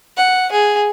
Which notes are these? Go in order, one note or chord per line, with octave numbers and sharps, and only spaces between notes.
F#5
G#4